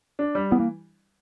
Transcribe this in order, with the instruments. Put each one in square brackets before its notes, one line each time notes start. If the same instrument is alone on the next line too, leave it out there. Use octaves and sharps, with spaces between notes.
[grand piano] D4
G3
[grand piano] E3 [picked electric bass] B3
[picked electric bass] A#3